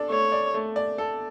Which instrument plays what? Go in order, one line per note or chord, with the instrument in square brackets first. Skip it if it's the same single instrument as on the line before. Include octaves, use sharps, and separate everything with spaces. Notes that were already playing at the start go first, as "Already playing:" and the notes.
Already playing: [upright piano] D4 A4 D5
[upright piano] A3 [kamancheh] C#5
[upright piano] D5
A3
D5
A4